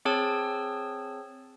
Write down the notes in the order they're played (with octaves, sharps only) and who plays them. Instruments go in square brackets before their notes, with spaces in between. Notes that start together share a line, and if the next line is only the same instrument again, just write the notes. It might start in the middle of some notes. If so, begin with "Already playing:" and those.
[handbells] C4 G#4 C#5 A5 E6